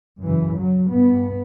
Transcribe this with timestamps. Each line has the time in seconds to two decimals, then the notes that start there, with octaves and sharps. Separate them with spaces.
0.24 F#2 C#3 E3
0.57 F#3
0.88 G2 B3